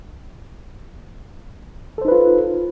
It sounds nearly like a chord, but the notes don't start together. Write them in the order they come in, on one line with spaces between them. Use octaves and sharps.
A4 C5 D#4 B4 F4